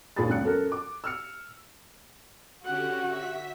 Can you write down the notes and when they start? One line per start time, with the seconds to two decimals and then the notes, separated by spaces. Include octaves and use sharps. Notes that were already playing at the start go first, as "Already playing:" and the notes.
0.16 D#2 A#2 D4 G#4 B5 A6
0.29 C#2 F#2 F#6 C#7
0.44 F#2 A4 A#4
0.72 D6
1.04 E6 F6 C#7
2.64 D3 C#4 F#4 G4 F#5
3.07 E5 B6